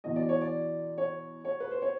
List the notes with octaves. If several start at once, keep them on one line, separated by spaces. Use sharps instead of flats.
E2 B2 D#5
D5
C#5
D5
C#5
C#5
B4
C5
C#5